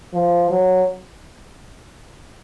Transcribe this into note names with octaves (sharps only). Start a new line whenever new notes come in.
F3
F#3